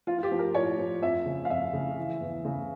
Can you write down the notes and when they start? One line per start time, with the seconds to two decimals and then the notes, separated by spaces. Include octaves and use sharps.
0.07 F3 F4
0.18 F4
0.23 G4
0.32 F3
0.39 A#4
0.54 A2 C#5
0.79 F3
1.02 F2 E5
1.26 C#3
1.45 F5
1.50 F2 E5
1.73 C#3
1.97 E3
2.21 E2
2.45 C#3